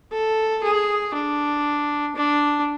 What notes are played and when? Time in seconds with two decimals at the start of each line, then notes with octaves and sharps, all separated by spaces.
0.12 A4
0.63 G#4
1.14 D4
2.16 D4